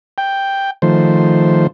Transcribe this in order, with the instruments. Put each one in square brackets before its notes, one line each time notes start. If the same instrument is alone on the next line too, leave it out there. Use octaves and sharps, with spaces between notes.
[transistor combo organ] G5
D#3 F3 A3 C5